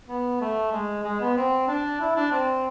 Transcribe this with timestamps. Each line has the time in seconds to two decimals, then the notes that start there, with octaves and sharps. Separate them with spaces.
0.08 B3
0.41 A3
0.72 G#3
1.03 G#3
1.20 B3
1.36 C4
1.68 D4
2.00 E4
2.15 D4
2.32 C4